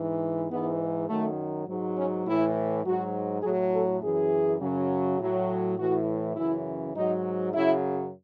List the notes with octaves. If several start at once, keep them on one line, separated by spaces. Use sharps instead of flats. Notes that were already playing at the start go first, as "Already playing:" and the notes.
Already playing: G#2 E3
G#2 E3 B3
F#2 D#3 F#3 A3
G#2 F#3
C#4
A2 E3 E4
G#2 F#3 F#4
F#3 G#4
A2
A4
F#2 E3 G#4
F#2 C#3 F#3
A2 F#3
A2 E3 F#4
F#2 C#3 E3 E4
G#2 F#3 D#4
F#2 C#3 F#3 E4